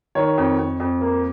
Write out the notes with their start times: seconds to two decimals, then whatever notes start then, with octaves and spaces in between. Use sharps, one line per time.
0.15 D#3 C#5
0.37 F2
0.58 F2
0.80 F2
1.01 A#3